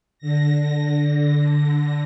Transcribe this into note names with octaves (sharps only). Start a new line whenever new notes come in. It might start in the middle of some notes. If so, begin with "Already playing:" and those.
D3 A#6